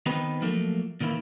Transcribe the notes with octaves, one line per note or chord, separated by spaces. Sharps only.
D#3 B3 C4 D#4 G4 B4
F3 F#3 A3 A#3
A#2 D#3 E3 A#3 E4